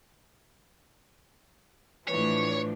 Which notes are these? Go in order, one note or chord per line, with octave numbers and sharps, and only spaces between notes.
A2 E3 F3 D4 B4 C#5